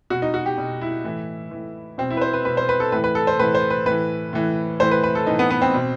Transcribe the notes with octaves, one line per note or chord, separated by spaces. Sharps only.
B2 F#4
D#4
F#4
G4
B2
E4
A2 E3
A2 E3
B2 C4
E4
B4
C5
B4
B2 B4
C5
B4
A4
A2 E3 B4
B4
A4
C5
A2 E3 B4
C5
B4
A2 E3 B4
A2 E3
A2 E3 C5
B4
B4
A4
A2 E3 D#4
B3
B3
C4
B2